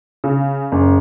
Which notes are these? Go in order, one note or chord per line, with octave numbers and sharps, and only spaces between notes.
C#3
F#1